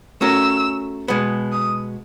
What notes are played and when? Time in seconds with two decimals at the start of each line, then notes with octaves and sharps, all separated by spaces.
0.21 A3 C#4 F#4 A#4 E6
1.08 B2 G#3 B3
1.52 D#6